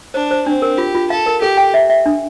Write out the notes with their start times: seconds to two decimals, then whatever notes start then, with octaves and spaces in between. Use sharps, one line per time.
0.14 D4 C5
0.31 C5
0.46 C4 D4
0.62 A#4
0.78 F4 G4
0.95 F4
1.10 A4 F5
1.26 A#4
1.42 G4 A4
1.57 G5
1.74 E5
1.90 E5
2.06 D4